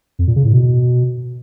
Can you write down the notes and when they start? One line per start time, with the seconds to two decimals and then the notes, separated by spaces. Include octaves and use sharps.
0.19 F2
0.27 A#2
0.36 C#3
0.45 A2
0.53 B2